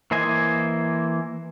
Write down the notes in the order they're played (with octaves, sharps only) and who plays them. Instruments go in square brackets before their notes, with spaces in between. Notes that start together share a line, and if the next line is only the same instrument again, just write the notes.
[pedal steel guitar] E3 A#3 C5 D#5 G#5